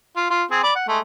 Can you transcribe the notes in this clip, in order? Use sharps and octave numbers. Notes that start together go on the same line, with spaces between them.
F4
F4 C6
C4 G#4
D5 B5
F#5
G#3 A3